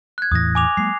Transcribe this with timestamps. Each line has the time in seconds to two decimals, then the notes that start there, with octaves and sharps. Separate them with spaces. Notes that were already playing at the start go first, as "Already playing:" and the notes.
0.18 F#6 G#6
0.32 E2 A2 E3 D#6 A#6
0.55 G#5 D6 F7
0.77 F#3 G#3 A#3 C7